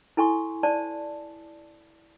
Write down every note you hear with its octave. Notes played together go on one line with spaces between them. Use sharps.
E4 A4 G#5 C6 C#6
C5 D5 A5